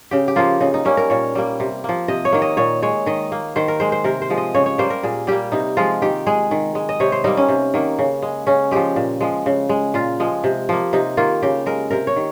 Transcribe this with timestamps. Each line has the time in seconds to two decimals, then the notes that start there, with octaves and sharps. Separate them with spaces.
0.11 C#3 G4
0.28 G4
0.36 F3 A#3 F4
0.60 C#3 D#4
0.74 D#4
0.85 G3 A#3 C#4
0.97 A#4
1.10 A#2 C#5
1.35 G3 A#3
1.60 C3
1.84 F3 A#3
2.08 C3 D#5
2.25 C#5
2.32 D#3 A#3
2.42 D#5
2.57 A#2 C#5
2.82 G#3 C#5
3.06 D#3 D#5
3.32 A#3
3.56 D#3 C5
3.68 A#4
3.80 G#3 C5
3.92 C5
4.04 C3 A#4
4.22 C5
4.30 F3 G#3
4.37 D#5
4.54 C#3 C#5
4.66 C#5
4.78 G3 A#3 C5
4.90 A#4
5.03 A#2 G#4
5.27 G3 A#3 G4
5.52 C3 D#4
5.77 F3 G#3 F4
6.02 D#3 G4
6.26 G#3 G#4
6.51 D#3
6.75 G#3
6.89 D#5
7.00 C3 C#5
7.12 C5
7.24 G3 A#3 D#4
7.37 C#4
7.49 C3
7.74 D#3 A#3
7.99 C#3
8.22 G#3
8.47 C#3 C#4
8.71 F3 G#3 G4
8.96 A#2
9.21 F3 G#3
9.46 C#3
9.69 G#3
9.94 A#2 F4
10.20 F3 G#3
10.44 C3
10.69 F3 A#3
10.93 C3 D#4
11.17 D#3 A#3 F4
11.42 C#3 G4
11.66 G#3 A#4
11.91 C3 A#4
12.07 C#5
12.16 D#3